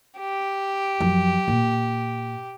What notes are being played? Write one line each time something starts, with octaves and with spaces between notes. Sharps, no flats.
G4
F#2 F3
A#2